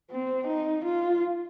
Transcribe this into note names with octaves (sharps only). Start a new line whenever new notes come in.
C4
D#4
F4